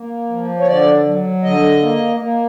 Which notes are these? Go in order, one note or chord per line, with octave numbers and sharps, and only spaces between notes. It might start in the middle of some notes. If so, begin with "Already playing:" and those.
Already playing: A#3
F3
C#5
D3 D5
F#3
D3 D#5
A#3
A#3